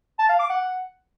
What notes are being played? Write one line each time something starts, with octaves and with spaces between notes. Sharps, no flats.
A5
F5
D6
F#5